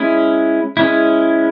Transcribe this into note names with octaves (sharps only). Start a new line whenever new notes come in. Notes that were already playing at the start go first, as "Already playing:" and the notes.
Already playing: G#3 C#4 E4
G#3 C#4 E4